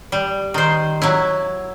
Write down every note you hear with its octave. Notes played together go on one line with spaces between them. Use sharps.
G3
D#3 C5
F#3 E4